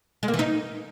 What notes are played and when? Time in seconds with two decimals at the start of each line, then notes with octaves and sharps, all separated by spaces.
0.23 G#3
0.28 A#3
0.34 E3
0.39 D#4